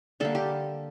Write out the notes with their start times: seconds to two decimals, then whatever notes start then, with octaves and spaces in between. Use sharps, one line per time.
0.20 D3 G3 A#3 A4
0.35 G4